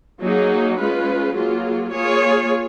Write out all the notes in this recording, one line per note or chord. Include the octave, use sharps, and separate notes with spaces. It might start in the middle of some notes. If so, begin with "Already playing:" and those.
F#3 A#3 D#4 G#4
G#3 C#4 F4 B4
F#3 A#3 F4 G#4
A#3 F4 G#4 C#5